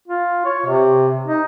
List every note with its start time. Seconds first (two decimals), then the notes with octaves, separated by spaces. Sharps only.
0.08 F4
0.45 C#5
0.66 C3
1.27 D#4